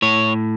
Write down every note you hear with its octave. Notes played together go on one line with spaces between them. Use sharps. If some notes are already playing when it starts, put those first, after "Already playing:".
A2 C#5